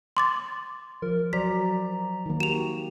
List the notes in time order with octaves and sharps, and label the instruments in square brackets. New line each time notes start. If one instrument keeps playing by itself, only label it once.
[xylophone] C6 D6 A6
[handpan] F3 [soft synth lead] A#4
[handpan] F#3 C5 D5 [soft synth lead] A#5 [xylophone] B6
[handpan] D#3 A#3
[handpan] F#4 G4 [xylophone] E7 F7